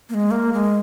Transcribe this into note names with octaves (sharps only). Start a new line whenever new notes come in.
A#3
G#3
A#3
G#3